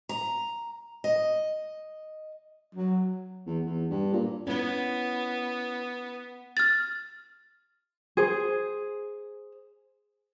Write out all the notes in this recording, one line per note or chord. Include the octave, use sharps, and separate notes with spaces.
A#5
D#5
F#3
E2
E2
G2
A#2
B3 C#4 E4
F6 A6
G#4 C5